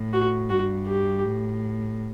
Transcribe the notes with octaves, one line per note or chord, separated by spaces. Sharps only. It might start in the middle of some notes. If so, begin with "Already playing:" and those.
Already playing: A2
F#4
G2 F#4
G4
A2